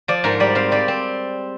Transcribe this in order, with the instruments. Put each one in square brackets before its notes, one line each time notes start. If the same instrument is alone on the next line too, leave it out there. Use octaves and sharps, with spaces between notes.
[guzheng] F3 D5
G#2 A#4
G3 D5
C4 F5
G3 D5
C4